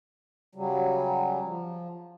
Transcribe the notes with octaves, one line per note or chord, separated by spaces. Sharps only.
C#3 F#3 G3
F3